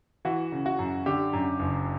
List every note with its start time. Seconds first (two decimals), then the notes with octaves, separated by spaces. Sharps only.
0.25 E3 F#4
0.52 C#3
0.66 F#4
0.79 F#2
1.06 D3 G4
1.33 F#2
1.59 F#1